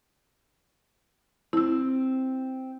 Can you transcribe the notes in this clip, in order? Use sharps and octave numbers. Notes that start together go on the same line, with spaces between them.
C4 E4 E6